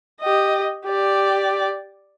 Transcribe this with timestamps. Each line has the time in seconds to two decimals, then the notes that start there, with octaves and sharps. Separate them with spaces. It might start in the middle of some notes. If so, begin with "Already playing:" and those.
0.21 G4 D#5
0.86 G4 D5